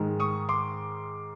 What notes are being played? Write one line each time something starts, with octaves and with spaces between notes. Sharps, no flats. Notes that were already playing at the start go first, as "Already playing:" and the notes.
Already playing: G#2 D#3 G#3
C#6 D#6
C6 D6